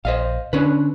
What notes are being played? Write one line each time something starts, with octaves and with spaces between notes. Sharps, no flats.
A#1 C5 D#5 F5
D3 C#4 D4 B4